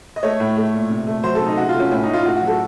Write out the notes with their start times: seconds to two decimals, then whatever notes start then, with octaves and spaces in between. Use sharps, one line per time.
0.16 D#5
0.23 A3 C#5
0.40 A2
0.57 A3
0.73 A#2
0.90 C3
1.07 A3
1.24 F#3 C5
1.35 A4
1.41 C3 D#4
1.57 C#3 F#4
1.69 F4
1.75 A3
1.80 C#4
1.91 A2 C#4
2.03 D#4
2.08 A2
2.14 F4
2.25 A3 F#4
2.36 F#4
2.42 F#3
2.47 A4